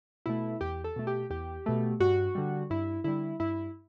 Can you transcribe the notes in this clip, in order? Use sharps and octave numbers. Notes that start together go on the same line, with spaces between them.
B2 A3 E4
E2 G4
A4
B2 A3
G4
E2 G4
B2 A3
G2 F#4
D3 G3
G2 E4
D3 G3 E4
G2 E4